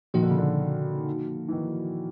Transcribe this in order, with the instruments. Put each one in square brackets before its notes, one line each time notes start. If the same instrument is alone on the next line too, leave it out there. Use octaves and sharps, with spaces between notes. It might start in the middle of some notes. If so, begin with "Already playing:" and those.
[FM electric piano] A#2 F3 A#3 D#4 F#4 [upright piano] D#3
[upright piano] D3
C#3
D3
E3
D#3